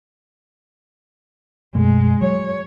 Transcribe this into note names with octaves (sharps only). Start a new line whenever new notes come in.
F#2 B2 G#3 A3
F#3 C#5